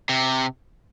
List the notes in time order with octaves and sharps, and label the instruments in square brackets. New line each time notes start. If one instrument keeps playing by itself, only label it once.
[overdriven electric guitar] C3